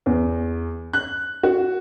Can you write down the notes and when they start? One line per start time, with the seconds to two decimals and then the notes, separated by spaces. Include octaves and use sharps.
0.06 E2
0.93 F#6
1.43 F#4